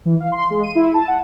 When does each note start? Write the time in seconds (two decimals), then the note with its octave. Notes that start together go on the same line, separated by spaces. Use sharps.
0.05 E3
0.20 F5
0.32 C6
0.50 G#3
0.63 D#7
0.75 E4
0.94 A5
1.08 F#5